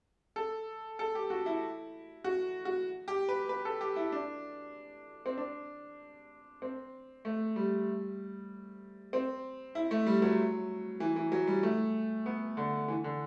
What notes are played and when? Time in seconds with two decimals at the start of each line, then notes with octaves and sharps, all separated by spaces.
0.36 A4
0.99 A4
1.15 G4
1.30 F#4
1.46 E4
2.24 F#4
2.65 F#4
3.08 G4
3.29 B4
3.49 B4
3.65 A4
3.81 G4
3.96 E4
4.12 D4
5.26 C4
5.37 D4
6.62 C4
7.25 A3
7.56 G3
9.13 C4
9.75 E4
9.91 A3
10.07 G3
10.22 F#3
11.00 E3
11.16 E3
11.32 F#3
11.47 G3
11.63 A3
12.26 B3
12.57 D3
12.88 E3
13.04 D3